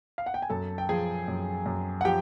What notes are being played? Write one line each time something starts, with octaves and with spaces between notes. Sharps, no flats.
F5
F#5
G5
G#5
F#2 A4 A5
G5
F3 G#4 G#5
F#2
F#2
F#5
F3 G4 G5